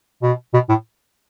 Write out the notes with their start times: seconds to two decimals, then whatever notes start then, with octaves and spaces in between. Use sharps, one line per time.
0.22 B2
0.54 B2
0.69 A2